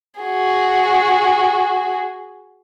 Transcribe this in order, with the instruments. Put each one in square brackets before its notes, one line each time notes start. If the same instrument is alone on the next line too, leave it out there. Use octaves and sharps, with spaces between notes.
[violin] F#4 G#4